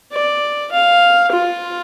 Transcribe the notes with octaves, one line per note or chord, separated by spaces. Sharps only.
D5
F5
F4